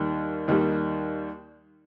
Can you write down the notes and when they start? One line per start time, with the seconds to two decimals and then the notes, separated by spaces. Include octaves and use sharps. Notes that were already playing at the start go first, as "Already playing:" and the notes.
Already playing: D#2 D#3 G3
0.48 D#2 D#3 G3